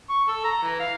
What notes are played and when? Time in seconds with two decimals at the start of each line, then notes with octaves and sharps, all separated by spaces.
0.09 C#6
0.28 A4
0.44 A#5
0.63 E3
0.80 F5